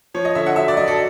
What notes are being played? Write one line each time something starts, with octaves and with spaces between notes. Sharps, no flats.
F3 C#5
D#5
D3 E5
F#5
F#3 E5
D5
F#3 D#5
A4